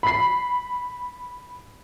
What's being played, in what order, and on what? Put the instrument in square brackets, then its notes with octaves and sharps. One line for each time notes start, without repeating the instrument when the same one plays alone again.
[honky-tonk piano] B5 C7